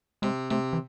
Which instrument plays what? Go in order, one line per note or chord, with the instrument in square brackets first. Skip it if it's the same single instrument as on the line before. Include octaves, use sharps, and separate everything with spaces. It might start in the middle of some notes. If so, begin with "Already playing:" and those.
[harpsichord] C3 [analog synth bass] G#3
[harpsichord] C3 [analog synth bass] A3
[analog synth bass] E3